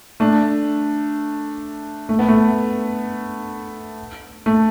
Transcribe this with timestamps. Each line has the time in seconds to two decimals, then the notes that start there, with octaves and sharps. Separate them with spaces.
0.20 A3 D4
2.09 A3
2.19 B3
2.28 A3
4.46 A3